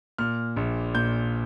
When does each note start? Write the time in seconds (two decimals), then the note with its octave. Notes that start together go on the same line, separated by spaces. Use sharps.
0.18 A#2 F6
0.56 A#1
0.94 A#2 G6